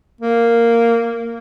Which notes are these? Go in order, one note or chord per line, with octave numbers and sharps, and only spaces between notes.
A#3